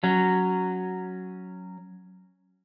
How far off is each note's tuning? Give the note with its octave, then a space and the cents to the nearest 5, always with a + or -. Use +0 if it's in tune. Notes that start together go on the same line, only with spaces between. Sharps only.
F#3 +0 C#4 +0